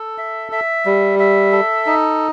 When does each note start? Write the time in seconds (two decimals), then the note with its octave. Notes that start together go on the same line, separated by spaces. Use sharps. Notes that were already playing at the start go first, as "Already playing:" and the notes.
Already playing: A4
0.18 E5
0.52 E5
0.85 G3
1.19 E5
1.52 A4
1.86 D#4